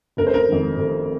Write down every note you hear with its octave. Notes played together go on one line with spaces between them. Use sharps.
F1 A#4
C5
A#4
F2 D#3
F1